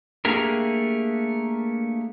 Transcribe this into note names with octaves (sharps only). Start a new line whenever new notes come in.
A3 A#3 D4 G4 G#4 A#4